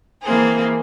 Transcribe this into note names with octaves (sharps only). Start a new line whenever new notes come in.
E3 A#3 C4 G#4